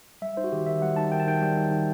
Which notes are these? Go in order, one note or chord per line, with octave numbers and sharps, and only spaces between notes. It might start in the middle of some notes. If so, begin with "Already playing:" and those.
G3 E5
D#4 C5
F#4
D#3 G4
D#3 E5
G3 F#5
D#4 A5
D#3 G5
A5
D#3 G5
G3
D#4
D#3